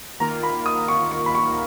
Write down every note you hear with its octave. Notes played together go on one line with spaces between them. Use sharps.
D#3 A#3 F4 A#4 A#5
B5
D#6
C#6
C#6
B5
C#6